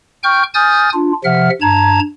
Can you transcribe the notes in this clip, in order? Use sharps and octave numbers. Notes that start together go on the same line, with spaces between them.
G5 C#6 F6 G6
G#5 D#6 F6 G6 A6
D4 F4
C3 F3 E5 F#5 F6
G2 A5 A#5 G#6